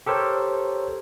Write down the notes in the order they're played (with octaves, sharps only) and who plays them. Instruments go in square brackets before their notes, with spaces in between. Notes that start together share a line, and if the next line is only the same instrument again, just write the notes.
[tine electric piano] G4 A4 A#4 C5 C#5